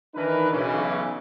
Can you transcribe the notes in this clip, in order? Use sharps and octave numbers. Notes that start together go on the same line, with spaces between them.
D#3 E3 D4 D#4 A#4 B4
B1 C#3 E3